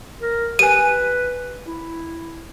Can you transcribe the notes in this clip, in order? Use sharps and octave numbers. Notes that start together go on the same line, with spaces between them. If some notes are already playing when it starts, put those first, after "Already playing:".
A#4
G4 B4 G#5 D#7
E4